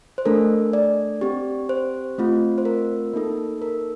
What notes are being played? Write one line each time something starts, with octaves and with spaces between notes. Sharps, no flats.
C5
A3 D4 A4 A#4
D5
C4 G4
C5
A3 C4 F4
C5
A#4
A#3 D#4 A4
A#4